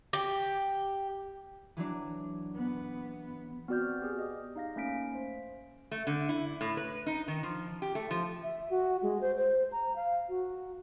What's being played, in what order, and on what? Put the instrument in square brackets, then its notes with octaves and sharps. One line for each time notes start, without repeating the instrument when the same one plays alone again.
[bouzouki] G4
[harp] E3 F#3 D4
[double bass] B3
[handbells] B3 C4 F#4 D5 F6 G6
B3 G4 G#4
D#5 D#6
D#4 F5 A#6
A3 A#3 C#4 F5 B6 D7
C5
[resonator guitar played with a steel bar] A3
D3
E4
A2
B4
D#4
D#3
F3
G4
A3
F3
[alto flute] E5
F#4
G#3
C5
C5
A#5
F5
F#4